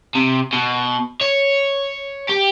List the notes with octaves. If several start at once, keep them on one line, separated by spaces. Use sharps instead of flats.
C3
B2
C#5
G4